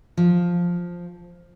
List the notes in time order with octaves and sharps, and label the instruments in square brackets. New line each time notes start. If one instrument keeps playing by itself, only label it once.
[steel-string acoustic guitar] F3